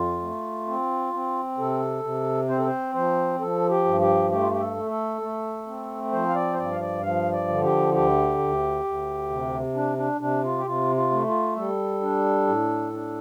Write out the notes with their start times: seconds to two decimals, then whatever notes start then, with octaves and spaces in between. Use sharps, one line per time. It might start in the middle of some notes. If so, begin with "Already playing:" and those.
Already playing: F2 F4
0.22 A3
0.67 C4
1.14 C4
1.58 C3 A4
2.03 C3
2.49 C4 C5
2.58 A4
2.66 C5
2.94 F3 C5
3.40 F3 A4
3.69 G4
3.85 G2
4.01 G4
4.31 A3 G4
4.40 F4
4.51 G4
4.60 A4
4.77 A3
4.91 A4
5.21 A3
5.67 C4
6.12 F3 C5
6.28 F5
6.35 D5
6.54 C5
6.58 G2 D5
6.72 F5
6.81 D5
7.02 F3 F5
7.33 D5
7.48 D3
7.63 G4
7.93 D2 G4
8.38 D2
8.84 D2
9.30 C3
9.75 D4
9.97 D4
10.20 C3 D4
10.44 F4
10.58 G4
10.66 C3 F4
10.95 F4
11.11 A3
11.27 F4
11.56 G3 A4
12.01 D4
12.47 A2
12.93 D4